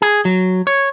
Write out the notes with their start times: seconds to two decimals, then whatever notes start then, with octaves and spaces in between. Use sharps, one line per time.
0.02 G#4
0.25 F#3
0.67 C#5